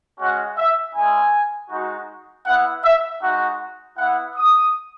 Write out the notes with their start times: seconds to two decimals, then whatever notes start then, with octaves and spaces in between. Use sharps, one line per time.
0.19 G#3 C#4 F#4 F#5
0.58 E5
0.95 G#3 C#4 E4 G#5
1.70 G#3 D#4 F#4
2.46 B3 E4 F#5
2.84 E5
3.22 G#3 D#4 F#4 F#5
3.98 B3 E4 F#5
4.36 D#6